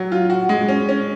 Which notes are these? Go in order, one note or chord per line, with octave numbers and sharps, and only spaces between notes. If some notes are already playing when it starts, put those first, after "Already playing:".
Already playing: F#3
F4
F#4
G#3
C#4
C#4